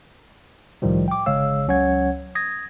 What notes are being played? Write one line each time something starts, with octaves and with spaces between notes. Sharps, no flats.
C2 A2 D#3 F3 G3
G5 D6
G1 C#3 G#3 C#5 F5 E6
C#2 F#3 C#4 C#5 F#5 G#6
D#6 G#6 A#6